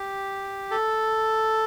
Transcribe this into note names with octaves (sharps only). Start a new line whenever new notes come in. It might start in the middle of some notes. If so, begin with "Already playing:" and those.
Already playing: G4
A4